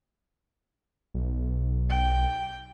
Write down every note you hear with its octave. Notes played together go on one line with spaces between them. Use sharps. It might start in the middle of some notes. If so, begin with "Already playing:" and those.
B1
G5